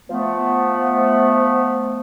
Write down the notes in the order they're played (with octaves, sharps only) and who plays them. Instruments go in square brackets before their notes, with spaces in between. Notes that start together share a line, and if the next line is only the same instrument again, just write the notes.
[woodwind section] F3 A3 B3